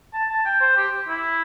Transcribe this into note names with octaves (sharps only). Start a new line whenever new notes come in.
A5
A5
G5
C5
G4
E4